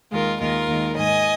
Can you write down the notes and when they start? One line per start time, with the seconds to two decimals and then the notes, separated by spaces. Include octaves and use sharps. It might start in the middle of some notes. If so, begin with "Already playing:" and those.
0.11 D#2 D#3 G#3 F4 A#4
0.40 D#2 D#3 G#3 F4 A#4
0.68 D#2 D#3 G#3
0.96 G#2 D#3 G#3 D#5 G#5